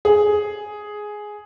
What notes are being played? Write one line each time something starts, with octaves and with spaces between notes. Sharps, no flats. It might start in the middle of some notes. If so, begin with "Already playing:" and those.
G#4